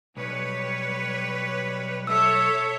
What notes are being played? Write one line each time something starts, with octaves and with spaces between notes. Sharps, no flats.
B1 G3 B4 C#5
A4 C#5 E5 E6